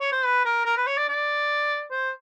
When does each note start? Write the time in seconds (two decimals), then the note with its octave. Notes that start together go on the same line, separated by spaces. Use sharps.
0.01 C#5
0.12 C5
0.25 B4
0.45 A#4
0.66 A#4
0.77 B4
0.87 C#5
0.98 D5
1.08 D5
1.92 C5